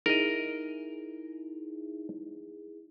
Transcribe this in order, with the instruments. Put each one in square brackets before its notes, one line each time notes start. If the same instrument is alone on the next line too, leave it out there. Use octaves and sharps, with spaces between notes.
[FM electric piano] D#4 E4 G#4 [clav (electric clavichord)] A#4 D#5